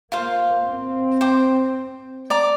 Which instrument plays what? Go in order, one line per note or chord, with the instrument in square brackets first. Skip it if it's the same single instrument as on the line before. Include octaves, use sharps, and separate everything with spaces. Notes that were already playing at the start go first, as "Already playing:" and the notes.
[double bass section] A#3 [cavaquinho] F4 C5 F5
[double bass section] C4
[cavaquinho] C5 G5 D6
D5 A#5 D6